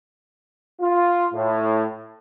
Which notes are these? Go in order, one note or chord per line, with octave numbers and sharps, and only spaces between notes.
F4
A2